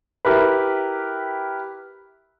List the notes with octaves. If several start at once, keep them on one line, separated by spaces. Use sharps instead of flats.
E4 G4 A#4 B4